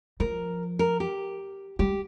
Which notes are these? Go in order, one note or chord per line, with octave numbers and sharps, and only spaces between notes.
F3 A#4
A#4
G4
G3 G4